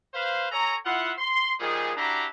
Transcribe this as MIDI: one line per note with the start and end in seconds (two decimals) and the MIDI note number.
0.14 0.47 71
0.14 0.47 72
0.14 0.47 77
0.52 0.74 69
0.52 0.74 73
0.52 0.74 80
0.52 0.74 82
0.85 1.12 64
0.85 1.12 65
0.85 1.12 76
0.85 1.12 78
1.18 1.53 84
1.60 1.92 46
1.60 1.92 51
1.60 1.92 53
1.60 1.92 55
1.60 1.92 68
1.97 2.25 62
1.97 2.25 64
1.97 2.25 66
1.97 2.25 67
1.97 2.25 82